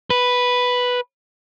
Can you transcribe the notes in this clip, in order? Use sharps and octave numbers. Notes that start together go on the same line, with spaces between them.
B4